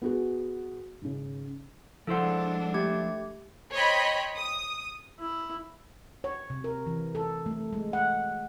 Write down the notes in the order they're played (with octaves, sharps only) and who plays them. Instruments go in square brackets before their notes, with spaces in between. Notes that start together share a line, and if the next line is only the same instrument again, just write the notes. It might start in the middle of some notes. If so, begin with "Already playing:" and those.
[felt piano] B3 F#4 G#4
G#1 C#3
[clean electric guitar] F3 E4 C5 [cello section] G#3 D4 [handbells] A4 F#5
[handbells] A3 G4 G#6
[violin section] C5 C#5 D#5 G5 B5
D#6
[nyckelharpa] E4
[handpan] C#5
C3
A#4
E3
A4
A3
G#3
F#5